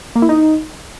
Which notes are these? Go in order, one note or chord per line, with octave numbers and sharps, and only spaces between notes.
A#3
E4
D#4